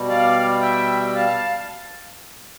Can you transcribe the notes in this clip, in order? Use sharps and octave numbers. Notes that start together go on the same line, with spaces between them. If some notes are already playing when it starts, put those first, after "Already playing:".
Already playing: B2 G3
D5 F5
E5 G5
F5 A5